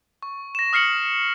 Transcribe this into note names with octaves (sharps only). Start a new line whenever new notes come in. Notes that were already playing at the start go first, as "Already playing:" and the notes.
C#6
A#6 E7
D#6 F6 C7 C#7 F#7